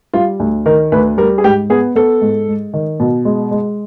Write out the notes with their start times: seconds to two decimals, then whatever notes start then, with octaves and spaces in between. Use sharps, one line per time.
0.13 G3 F4
0.40 D2
0.66 D#3 A#4
0.92 D2 B4
1.18 G3 A#4
1.38 G#4
1.44 G#2 G4
1.70 B3 G#4
1.96 B3 A4
2.21 G#2
2.48 G#3
2.74 D#3
3.00 B2
3.25 G#3
3.51 G#3